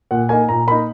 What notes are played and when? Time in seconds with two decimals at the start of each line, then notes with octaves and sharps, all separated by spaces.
0.11 A#2 F#5
0.29 A#3 D#4 G#5
0.49 A#2 A#5
0.67 A#3 D#4 B5